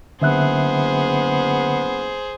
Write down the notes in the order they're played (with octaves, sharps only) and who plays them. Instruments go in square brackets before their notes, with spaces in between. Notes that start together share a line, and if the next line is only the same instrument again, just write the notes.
[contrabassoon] F#1 [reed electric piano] D3 E5 F#6 [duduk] B3 [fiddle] G#4 C5